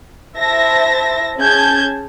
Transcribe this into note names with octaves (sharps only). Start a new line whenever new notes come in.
E4 C5 E5 A5 A#6
C#4 G#4 A5 G6 G#6